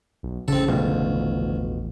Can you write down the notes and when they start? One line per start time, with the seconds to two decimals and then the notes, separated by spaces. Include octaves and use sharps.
0.23 B1
0.48 A1 C#3 C4 A4
0.68 E1 D2 B2 F3